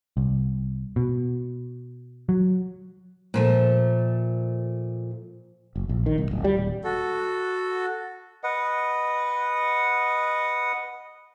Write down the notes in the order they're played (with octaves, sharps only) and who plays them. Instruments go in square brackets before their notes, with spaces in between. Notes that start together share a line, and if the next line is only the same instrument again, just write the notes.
[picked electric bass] C2
B2
F#3
[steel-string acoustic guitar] A#2 F3 A3
[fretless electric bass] F#1
A#1
D#3
C2
D1
G3
D#1
[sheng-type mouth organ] F#4 A4
[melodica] B4 D#5 F#5